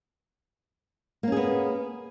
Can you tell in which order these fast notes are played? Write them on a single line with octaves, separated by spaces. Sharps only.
A#3 C#4 G#4 B3